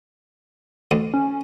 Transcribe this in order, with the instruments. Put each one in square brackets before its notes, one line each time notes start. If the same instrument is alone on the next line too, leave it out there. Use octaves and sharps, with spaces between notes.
[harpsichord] D2
[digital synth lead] C#4